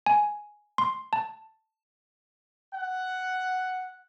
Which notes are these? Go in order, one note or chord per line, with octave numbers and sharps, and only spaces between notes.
G#5
C6
A5
F#5